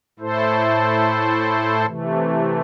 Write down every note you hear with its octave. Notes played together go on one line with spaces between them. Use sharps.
A2 A3 E4 A4 C5
C3 E3 A3